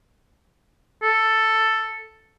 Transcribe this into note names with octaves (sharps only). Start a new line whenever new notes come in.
A4